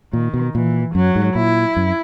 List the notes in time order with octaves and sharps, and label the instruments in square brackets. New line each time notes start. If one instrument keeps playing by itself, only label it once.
[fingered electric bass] A#2 [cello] D#3
[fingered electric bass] B2
[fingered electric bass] A#2 [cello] E3
[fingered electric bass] F#2 [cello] F#3
[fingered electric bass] G#2
[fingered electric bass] A#2 [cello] E4
[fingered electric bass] F#2